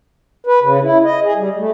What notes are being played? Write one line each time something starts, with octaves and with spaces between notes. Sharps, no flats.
B4
C#3
E4
D#5
G#4
G3
A3